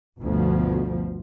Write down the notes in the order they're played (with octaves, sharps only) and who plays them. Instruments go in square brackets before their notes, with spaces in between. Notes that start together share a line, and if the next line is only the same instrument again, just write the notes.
[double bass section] G1 D2 B2 F3